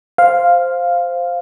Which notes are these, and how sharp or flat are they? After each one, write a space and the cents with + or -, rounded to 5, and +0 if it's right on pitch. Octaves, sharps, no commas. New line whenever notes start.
C5 +0 F5 +0